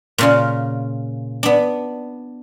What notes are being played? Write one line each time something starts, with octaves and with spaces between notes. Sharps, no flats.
A#2 C#3 F4
B3 D4